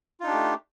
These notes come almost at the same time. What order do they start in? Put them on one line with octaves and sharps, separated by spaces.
F4 D#4 D4 G4 A3